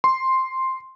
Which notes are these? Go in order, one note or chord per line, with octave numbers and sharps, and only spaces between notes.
C6